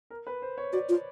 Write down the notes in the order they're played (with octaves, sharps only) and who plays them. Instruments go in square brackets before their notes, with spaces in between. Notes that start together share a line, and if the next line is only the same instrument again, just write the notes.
[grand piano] A#4
B4
C5
C#5
[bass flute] F#4 [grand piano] D5
[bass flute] F4